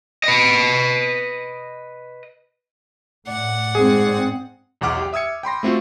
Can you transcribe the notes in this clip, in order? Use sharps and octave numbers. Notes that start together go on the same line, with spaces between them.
B4 D#5
A2 D5 F#5
G#2 C4 G#4
B1 E2 F#5 D6 F6
G4 G5
E5 D#6 E6 G#6 C#7
G5 B5 C6 A#6
A3 C4 F4 F#4